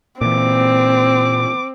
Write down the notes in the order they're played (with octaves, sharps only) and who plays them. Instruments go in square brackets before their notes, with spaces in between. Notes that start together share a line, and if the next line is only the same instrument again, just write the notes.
[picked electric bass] A#2 E3 [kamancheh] C4 [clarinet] D6